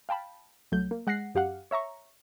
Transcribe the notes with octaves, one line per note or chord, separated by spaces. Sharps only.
F5 G5 A5 B5
C2 F#3 A3 G6
A#3
G#3 F#5 F#6 A#6 C7
F#2 G4 F5 F#5
C#5 E5 A#5 C#6